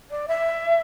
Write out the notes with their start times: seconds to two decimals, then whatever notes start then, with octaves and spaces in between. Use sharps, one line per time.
0.10 D5
0.27 E5